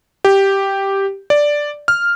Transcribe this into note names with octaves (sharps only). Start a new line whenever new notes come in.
G4
D5
F6